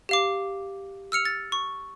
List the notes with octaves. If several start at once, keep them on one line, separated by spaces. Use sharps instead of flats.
G4 F5 D6
E6 F6 C#7 F7
A6
C#6